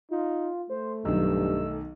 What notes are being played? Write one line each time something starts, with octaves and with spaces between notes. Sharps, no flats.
D#4 F4
A3 C5
B1 G2 D#3 E6